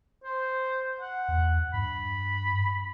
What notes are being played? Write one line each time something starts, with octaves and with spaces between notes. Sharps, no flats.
C5
F#5
E2
G2 B5